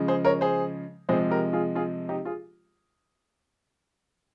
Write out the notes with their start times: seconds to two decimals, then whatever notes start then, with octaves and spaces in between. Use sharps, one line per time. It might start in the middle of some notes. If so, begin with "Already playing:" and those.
Already playing: C#3 F3 G#3
0.08 G#4 C5
0.25 A#4 C#5
0.41 G#4 C5
1.09 C3 F3 G#3 G#4 C5
1.31 G4 A#4
1.53 F4 G#4
1.75 F4 G#4
2.09 D#4 G4
2.25 F4 G#4